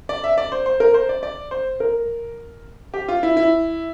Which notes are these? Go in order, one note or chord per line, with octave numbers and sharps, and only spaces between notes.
D5
E5
D5
C5
C5
A#4
C5
D5
D5
C5
A#4
G4
F4
E4
E4